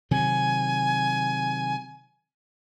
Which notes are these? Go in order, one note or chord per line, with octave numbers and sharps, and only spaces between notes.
C3 D#3 F#3 G#5